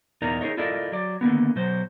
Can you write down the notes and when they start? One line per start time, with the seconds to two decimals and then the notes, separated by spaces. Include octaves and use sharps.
0.22 E2 B2 D#4 A#4 D5 A#5
0.41 D#4 G#4 A#4 C#5 D#5
0.57 E4 F4 A4 A#4 D5 D#5
0.92 F#3 D5
1.21 D3 D#3 A#3 B3
1.56 B2 F#3 C5